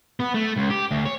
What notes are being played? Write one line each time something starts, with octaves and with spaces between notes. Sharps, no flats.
B3
A3
C#2
G4
D2
C#5